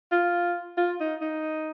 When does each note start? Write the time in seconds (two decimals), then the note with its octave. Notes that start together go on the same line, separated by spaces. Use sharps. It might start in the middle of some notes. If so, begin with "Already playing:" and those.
0.12 F4
0.77 F4
1.00 D#4
1.21 D#4